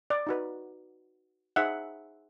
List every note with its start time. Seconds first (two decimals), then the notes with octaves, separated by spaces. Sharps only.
0.10 D5
0.27 D#4 F#4 B4
1.56 D#4 G#4 C5 E5 F#5